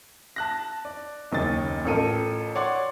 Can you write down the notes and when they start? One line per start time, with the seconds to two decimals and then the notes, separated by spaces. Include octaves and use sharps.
0.36 A5 F#6 A#6
0.85 D5
1.32 F#1 D#2 D#5 A6
1.85 A1 F4 A4 A#4 D#7
2.55 C#5 D5 F#5 C6 D6